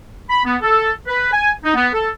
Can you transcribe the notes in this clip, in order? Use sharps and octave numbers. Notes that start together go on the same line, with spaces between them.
B5
B3
A4
B4
G#5
D#4
B3
A4